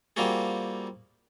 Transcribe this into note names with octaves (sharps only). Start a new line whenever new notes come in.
G3 A#3 C4 F4 F#4 G#4